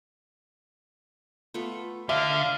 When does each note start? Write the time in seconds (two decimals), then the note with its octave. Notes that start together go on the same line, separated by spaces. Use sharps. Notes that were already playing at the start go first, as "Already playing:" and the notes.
1.54 A3 B3 F4
2.09 D3 D5 E5 F5